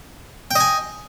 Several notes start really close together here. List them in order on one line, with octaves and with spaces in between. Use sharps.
G5 D#5 G#5